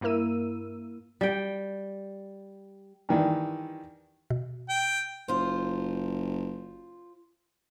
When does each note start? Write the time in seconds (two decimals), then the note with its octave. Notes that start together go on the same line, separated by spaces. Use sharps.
0.01 G2 A#3 E4 A#4 E6 D#7
1.21 G3 G5
3.09 G2 D#3 E3
4.30 B2
4.69 G5
5.28 F#1 F4 C5